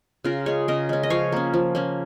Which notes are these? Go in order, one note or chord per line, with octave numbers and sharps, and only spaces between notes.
C#3 F4 A#4
G#3 C#4 G#4 C#5
C#3 A#4 D#5
G#3 C#4
D#5
F3 C#5 F5
A#3 C#4
F3
A#3 C#4